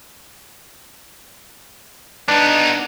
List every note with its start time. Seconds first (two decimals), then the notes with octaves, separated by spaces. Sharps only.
2.28 B3 D4 D#4